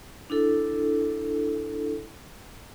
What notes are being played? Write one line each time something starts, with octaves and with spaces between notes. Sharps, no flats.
D4 E4 A4